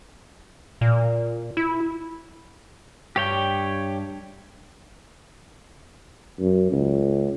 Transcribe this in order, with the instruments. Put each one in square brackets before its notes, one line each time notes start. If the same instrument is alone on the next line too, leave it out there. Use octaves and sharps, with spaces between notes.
[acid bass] A#2
E4
[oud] G2 [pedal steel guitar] G4 C#5 G5
[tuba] F#2
C#2